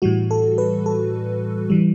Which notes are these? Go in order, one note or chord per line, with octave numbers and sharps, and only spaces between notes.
A2 E3 G3 F#4
A4
B4
A4
E3 G3